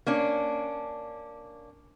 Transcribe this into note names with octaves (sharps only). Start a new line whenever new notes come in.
A#3 C#4 D4